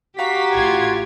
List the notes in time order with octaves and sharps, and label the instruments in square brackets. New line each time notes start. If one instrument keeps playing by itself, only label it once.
[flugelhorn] F#4 [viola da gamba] G4 [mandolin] F5 A#5 C#6 [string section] B6
[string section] A1 F4 G#6